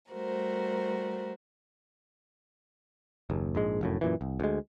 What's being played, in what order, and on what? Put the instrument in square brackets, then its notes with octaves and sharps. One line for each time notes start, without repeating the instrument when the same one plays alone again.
[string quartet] G3 A3 F#4 A#4 C5
[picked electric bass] F#1 D#2
A#1 G#2 G#3
F1 F#2 A2
F#2 A#2 E3
C2
D2 G#3